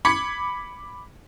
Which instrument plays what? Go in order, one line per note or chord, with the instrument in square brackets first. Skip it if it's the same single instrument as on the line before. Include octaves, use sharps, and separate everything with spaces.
[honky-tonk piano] B5 D6 G#6 B6 C#7